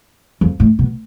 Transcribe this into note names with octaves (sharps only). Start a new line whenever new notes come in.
F2
A2
B2